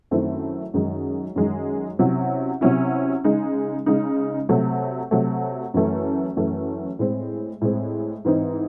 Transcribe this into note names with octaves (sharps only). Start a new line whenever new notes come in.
F#2 D#3 A3 C4 E4
F#2 D#3 G#3 D#4
F#2 D#3 G#3 D#4
C3 F#3 C#4 E4
C3 F#3 C#4 E4
C#3 G#3 D#4
C#3 G#3 D#4
C3 F#3 A3
C3 F#3 A3
F#2 E3 A3 C#4
F#2 E3 A3 C#4
A2 G#3 C4
A2 G#3 C4
G#2 E3 C4 D#4